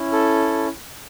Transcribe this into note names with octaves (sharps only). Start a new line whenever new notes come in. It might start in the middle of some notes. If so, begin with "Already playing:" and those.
Already playing: C#4 E4
A4